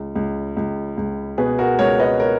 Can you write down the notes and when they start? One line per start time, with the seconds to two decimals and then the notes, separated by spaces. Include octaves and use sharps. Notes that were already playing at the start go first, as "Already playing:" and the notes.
Already playing: C#2
0.15 C#2
0.57 C#2
0.97 C#2
1.38 B2 G#4 B4
1.59 F#4 A#4
1.79 C#2 A#4 C#5
1.99 B4 D#5
2.20 A#4 C#5